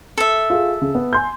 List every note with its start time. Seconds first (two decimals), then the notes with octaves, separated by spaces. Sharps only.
0.18 A4 E5
0.50 F4 G#4
0.82 C#3
0.95 B3
1.13 G#5 C6 G6